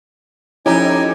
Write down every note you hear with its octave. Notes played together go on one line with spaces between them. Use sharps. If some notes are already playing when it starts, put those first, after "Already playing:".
F2 C#4 D#4 E4 G4 G#5 A#5